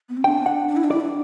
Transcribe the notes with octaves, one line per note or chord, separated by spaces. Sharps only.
B3
C4
D4 G5
F#5
D4
E4
D4
E4 D5
D4